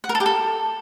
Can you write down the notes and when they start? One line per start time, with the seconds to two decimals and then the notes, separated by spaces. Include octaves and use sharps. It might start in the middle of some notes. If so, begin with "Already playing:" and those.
0.04 F#5
0.09 A#4
0.15 A4
0.20 G4
0.26 A4